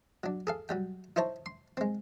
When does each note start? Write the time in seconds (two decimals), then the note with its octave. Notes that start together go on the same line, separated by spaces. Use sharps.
0.24 F#3 D4
0.47 G#4 A4 F5
0.69 F#3 G3 G5
1.16 D#4 E4 C5 C#5 A5
1.46 C6
1.77 G#3 C4